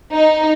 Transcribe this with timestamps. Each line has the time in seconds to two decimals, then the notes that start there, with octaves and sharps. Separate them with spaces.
0.13 D#4